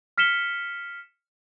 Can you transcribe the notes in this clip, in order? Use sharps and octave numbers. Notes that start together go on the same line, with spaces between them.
F6 B6 C#7 E7 G7